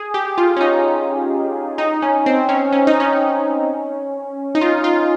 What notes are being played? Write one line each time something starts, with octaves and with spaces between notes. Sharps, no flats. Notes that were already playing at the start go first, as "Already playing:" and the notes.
Already playing: G#4
G4
F4
C#4
D#4
D#4
C#4
C4
C#4
C#4
D#4
C#4
D#4
F4
F4